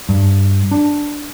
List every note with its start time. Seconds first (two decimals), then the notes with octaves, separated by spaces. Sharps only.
0.09 G2
0.71 D4